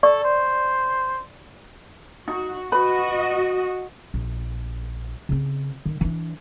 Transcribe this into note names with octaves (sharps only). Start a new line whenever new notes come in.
A4 D5 C#6
C5
D#4 F#4
F#4 B4 D#5 B5
A#1
C#3 C4
D#3
E3 D4